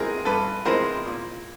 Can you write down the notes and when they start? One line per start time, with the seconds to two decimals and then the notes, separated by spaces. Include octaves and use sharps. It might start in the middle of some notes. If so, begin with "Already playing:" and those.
Already playing: E3 G#3 C4 G#4 A#4
0.25 G2 A4 B4
0.65 E3 G#3 C4 A#4 C5
1.06 A#2